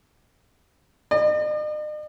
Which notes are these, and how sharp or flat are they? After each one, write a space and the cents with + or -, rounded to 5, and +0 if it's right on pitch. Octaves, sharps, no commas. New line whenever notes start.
D#5 -45